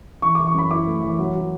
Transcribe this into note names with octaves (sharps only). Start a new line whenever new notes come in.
E3 C#6
E3 D6
C#6
F#2 B5
E4 D6
A3
E3
F#3
F#3